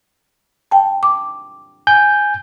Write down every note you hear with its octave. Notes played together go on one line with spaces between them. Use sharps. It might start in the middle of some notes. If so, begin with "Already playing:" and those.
G5 A5
D6
G#5 G6